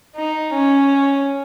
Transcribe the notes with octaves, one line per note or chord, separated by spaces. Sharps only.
D#4
C#4